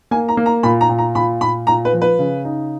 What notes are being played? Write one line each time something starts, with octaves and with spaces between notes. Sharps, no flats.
A#3 G#5
A#5
A#3
A#5
A#2 B5
A#5
A#2
A#5
A#2 B5
A#2 B5
A#2 A#5
B4
F3
B4
C#3
D#4